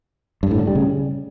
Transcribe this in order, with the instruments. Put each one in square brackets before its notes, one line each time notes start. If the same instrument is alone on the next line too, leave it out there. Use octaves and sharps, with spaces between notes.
[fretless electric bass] G2
A2
D3
G3
C#3